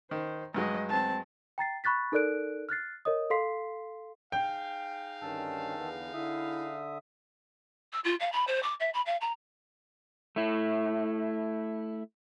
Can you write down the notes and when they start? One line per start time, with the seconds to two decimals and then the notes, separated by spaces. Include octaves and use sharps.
0.11 D#3 C5
0.54 G2 F#3 G#3 D#5
0.89 C4 A5
1.58 G5 A#5 A6 C7
1.84 B5 C#6 F#6 A6 B6
2.12 D#4 A4 A#4 D5 F#6 D7
2.69 F6 F#6 A6 C7
3.05 A#4 C#5 D#5 D#6
3.30 A4 F5 C6 B6 C7
4.32 D#4 G#4 F5 G5
5.22 G2 D3 D#3 C#4 A5 E6
5.78 E2 D3 B3
6.14 D3 E4 E5 D#6
7.92 E6
8.04 F4
8.20 F5
8.32 B5
8.47 C5
8.63 D6
8.80 E5
8.93 B5
9.06 F5
9.21 A#5
10.36 A3 E4